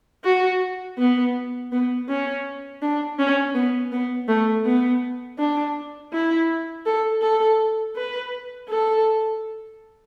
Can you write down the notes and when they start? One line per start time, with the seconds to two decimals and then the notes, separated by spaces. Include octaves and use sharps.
0.24 F#4
0.99 B3
1.72 B3
2.09 C#4
2.82 D4
3.19 C#4
3.55 B3
3.92 B3
4.29 A3
4.66 B3
5.39 D4
6.13 E4
6.86 A4
7.22 A4
7.96 B4
8.69 A4